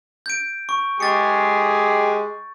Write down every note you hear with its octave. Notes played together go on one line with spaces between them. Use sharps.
G6 D7
C#6
G#3 G4 G#4 C#6 A6 C#7